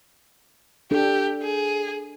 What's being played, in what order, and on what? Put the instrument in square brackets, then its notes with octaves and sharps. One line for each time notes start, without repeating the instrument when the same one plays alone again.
[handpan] D4 A4 [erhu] G4
[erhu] G#4